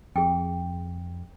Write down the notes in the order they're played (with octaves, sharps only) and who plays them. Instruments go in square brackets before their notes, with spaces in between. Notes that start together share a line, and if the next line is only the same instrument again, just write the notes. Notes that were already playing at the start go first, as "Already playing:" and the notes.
[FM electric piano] F2 [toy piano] G#4 G5